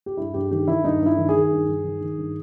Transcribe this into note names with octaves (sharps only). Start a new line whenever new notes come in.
G4
G2 E4
G2 G4
D#3 G4
D#3 E4
G2 D#4
G2
E4
D#3
G#4
D#3
G2
G2
D#3
D#3
G2